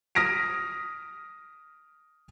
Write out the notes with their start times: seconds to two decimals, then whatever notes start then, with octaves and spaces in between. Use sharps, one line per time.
0.15 D#6 F6 A#6 B6 D7